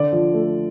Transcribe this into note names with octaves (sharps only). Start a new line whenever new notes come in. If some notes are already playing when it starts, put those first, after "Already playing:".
Already playing: D3 D5
F3
A3